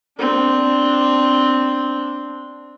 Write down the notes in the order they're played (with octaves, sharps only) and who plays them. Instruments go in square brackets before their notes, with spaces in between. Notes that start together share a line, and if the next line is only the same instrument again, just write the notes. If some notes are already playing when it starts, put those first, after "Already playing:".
[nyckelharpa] C4 D4